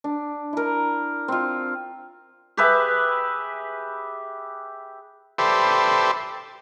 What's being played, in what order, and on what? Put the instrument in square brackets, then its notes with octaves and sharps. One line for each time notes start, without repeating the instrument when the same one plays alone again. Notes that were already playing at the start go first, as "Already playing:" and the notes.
[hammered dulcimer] D4
E4 A#4
C4 F4
G4 G#4 B4 E5
[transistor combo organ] G4 A4 B4 C5 D5 E5